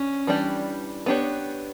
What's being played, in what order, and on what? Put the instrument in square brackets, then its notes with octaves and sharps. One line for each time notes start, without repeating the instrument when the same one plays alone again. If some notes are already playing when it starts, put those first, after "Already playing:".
Already playing: [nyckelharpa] C#4 [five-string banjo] D4
[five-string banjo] E3 G3 D4 G4 D5
B3 D4 G4 C#5